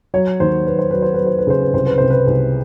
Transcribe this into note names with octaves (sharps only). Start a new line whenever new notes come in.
F#3 C#5
D#2 C5
F#3 B4
C5
F#3 B4
C5
B4
F#3
C5
B4
C#3 C5
B4
C2 C5
B4
C3 C5
B4
C2